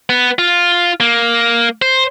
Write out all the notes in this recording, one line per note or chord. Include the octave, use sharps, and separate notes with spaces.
B3
F4
A#3
C5